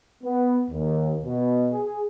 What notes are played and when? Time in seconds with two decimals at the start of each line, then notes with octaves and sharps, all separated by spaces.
0.23 B3
0.70 D#2
1.24 B2
1.72 G#4